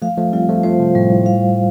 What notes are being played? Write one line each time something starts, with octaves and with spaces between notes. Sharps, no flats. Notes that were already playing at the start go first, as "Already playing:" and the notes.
F3 A3 F5
F3 A3
G3 C4 F4
F3 A3
F3 A3 C5
C3 F3
A2 G3
A2
A2 F5